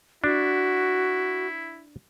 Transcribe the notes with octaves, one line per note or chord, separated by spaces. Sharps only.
D4 E4 F#4